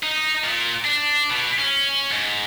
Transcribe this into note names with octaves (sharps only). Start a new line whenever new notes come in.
D#4
A#2
D4
B2
C#4
G#2